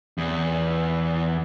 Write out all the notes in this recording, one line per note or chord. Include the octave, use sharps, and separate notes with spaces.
E2